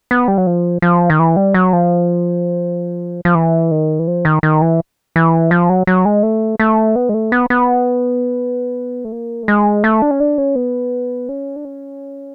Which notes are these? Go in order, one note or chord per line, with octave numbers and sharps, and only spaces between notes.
B3
G3
F#3
F3
F3
D#3
E3
G3
F#3
F3
F3
E3
D#3
E3
F3
D#3
D#3
E3
E3
F3
F#3
F#3
G#3
A3
A3
B3
G#3
A3
B3
B3
A3
A#3
A3
G#3
A3
D4
C#4
D4
C#4
B3
C#4
D4
C#4